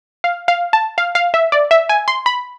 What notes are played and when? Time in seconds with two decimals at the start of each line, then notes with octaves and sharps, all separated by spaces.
0.24 F5
0.48 F5
0.73 A5
0.98 F5
1.15 F5
1.34 E5
1.52 D5
1.71 E5
1.89 G#5
2.08 C6
2.26 B5